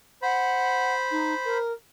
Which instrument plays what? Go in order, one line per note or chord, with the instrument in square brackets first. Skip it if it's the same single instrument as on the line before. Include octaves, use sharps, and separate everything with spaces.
[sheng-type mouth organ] C5 B5 [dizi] F#5
[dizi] D#4
A#4